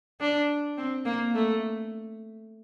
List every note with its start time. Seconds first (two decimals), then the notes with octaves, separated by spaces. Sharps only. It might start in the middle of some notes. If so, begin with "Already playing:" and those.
0.20 D4
0.78 C4
1.05 A#3
1.35 A3